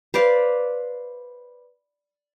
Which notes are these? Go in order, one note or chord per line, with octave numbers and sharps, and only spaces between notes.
B4 C5 D5 F5